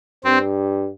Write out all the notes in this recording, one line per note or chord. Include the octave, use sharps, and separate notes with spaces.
G2 C4